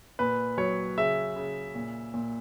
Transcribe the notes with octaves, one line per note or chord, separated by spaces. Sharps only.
A#2 B4
F#3 C#5
C#3 E5
C#3
A#2
A#2